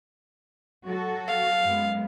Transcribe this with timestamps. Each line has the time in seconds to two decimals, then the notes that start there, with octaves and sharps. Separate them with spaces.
0.85 F#3 F#4 A4
1.28 F5
1.64 F#2 G#3 B3